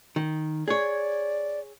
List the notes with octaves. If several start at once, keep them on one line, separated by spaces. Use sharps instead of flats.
D#3
G#4 C#5 D5